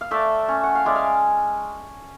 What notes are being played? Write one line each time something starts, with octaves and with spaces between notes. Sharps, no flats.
F5
A3 D5 E5
C#4
F#5
F5
G#3 D5 E5
F5